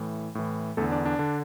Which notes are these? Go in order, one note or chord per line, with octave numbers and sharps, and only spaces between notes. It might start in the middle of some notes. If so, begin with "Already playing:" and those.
Already playing: A2 E3
A2 E3
E2 D3 A3 A4
D4 D5
D4
D3